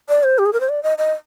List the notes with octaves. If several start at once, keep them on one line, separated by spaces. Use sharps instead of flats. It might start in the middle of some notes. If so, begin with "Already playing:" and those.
D5
C5
G4
G#4
A#4
C5
D5
D#5
D#5